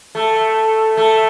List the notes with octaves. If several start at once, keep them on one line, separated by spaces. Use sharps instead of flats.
A3
A3